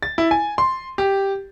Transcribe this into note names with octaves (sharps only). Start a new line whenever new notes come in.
A6
E4
G#5
C6
G4